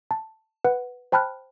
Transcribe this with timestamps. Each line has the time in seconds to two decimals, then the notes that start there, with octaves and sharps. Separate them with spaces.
0.11 A5
0.65 B4 F#5
1.12 C5 G5 A5 B5 F6 F#6